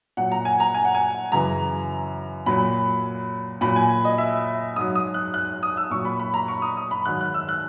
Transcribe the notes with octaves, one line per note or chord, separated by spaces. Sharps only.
A#2 F#3 F#5
A#5
G#5
A#5
G#5
F#5
G#5
F#2 C#3 E3 A#5
A#2 F#3 B5
A#2 F#3 B5
G#5
D#5
E5
G#2 F#3 D#6
D#6
F#6
F#6
D#6
E6
A#2 F#3 C#6
B5
B5
A#5
C#6
D#6
D#6
B5
G#2 D#3 F#3 F#6
F#6
E6
F#6